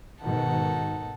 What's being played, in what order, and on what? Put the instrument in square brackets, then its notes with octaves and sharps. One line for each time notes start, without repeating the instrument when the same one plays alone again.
[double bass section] G#2 B2 D#3 [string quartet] D#4 A4 F#5